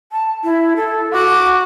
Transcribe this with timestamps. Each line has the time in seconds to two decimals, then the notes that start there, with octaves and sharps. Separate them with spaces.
0.12 A5
0.44 E4
0.76 A4
1.13 F#4 D6